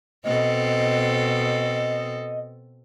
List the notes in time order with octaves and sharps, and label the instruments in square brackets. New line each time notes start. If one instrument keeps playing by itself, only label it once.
[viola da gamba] B2 C4 A4 [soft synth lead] D#5